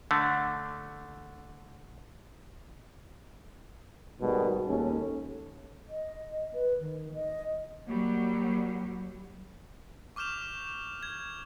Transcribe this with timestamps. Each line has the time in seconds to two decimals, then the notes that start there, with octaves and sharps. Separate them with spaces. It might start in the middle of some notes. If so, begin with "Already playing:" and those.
0.11 D3 A3
4.21 G#1 G#2 B2 D#3 G3
4.68 D#2 G#3 C#4 A4
5.89 D#5
6.53 B4
6.80 D#3
7.14 D#5
7.87 F#3 G3 A#3
10.16 C#6 D6 F6 G6 E7 F7
11.03 G#6